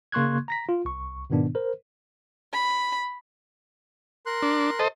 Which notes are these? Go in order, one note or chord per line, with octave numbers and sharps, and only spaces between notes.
C#3 A#3 C6 C#6 F#6 G#6
A#5 A#6 B6
F4
C2 C#6
G#2 B2 D#3 B3 D4
A#4 C5
B5
A#4 C6 F#6
D4
A4 C5 D#5